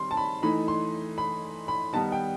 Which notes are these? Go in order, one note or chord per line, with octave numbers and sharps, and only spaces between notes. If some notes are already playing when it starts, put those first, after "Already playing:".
Already playing: D#3 G3 C4 C6
A5
B5
E3 A3 D#4 B5
C6
B5
B5
D#3 G3 B3 D#4 A5
G5